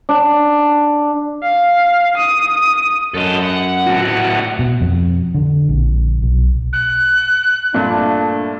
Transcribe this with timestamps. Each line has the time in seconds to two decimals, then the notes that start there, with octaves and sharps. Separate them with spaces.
0.09 D4
1.43 F5
2.17 D#6
3.14 F#2 A4 D#5
3.43 F#5
3.87 A2 F#4
4.59 B2
4.81 F2
5.35 D3
5.69 A#1
6.22 B1
6.73 F#6
7.74 G2 A#2 A3 D4